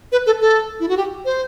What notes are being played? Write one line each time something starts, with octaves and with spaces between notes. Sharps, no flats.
B4
A4
A4
E4
F#4
G4
C5